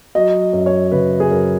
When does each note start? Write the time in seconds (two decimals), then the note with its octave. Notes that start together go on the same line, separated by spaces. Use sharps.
0.15 F#3 D#5
0.53 F#2
0.66 C#5
0.91 C#3 B4
1.20 G#4
1.31 F#2 A#4